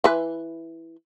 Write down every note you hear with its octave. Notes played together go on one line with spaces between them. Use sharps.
E3 B4